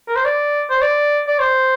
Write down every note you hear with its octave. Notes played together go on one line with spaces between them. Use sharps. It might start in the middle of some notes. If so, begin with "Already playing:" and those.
A#4
C5
D5
C5
D5
D5
C5